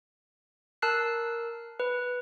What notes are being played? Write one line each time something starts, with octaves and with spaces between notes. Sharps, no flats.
A#4 A5 E6 F#6 C7
B4